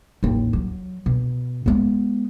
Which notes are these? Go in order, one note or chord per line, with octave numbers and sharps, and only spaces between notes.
A1 D#2
F#3
B2
G#3 B3